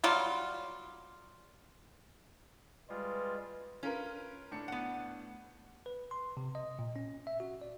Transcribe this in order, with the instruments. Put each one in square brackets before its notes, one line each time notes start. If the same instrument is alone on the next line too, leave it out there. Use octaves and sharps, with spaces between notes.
[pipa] F#3 G3 F4
[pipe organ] G3 G#3 F4 [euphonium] B4
[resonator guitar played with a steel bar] C#4 [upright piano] F4 A#4 B4
[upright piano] A2 D4 C#7
[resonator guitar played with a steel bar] B3 F#5
[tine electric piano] B4
C6
C3
D#5
A#2
C#4
E5
F#4
D5